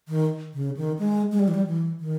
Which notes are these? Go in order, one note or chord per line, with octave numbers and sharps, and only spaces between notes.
D#3
C#3
D#3
G#3
G#3
G3
E3
G3
E3
D#3